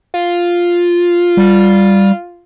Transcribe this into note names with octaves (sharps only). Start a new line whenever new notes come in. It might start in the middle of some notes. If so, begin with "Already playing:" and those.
F4
G3